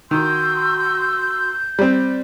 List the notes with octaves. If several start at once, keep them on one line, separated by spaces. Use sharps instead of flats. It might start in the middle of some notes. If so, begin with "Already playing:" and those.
D#3 F#4 C6 E6 G6
G3 C4